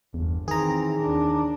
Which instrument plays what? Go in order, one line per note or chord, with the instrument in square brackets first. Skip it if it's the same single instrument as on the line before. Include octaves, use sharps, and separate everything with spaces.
[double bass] G1 [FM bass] E2
[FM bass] D#3 [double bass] E3 C4 [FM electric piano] G#4 A#5
[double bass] D#2 D4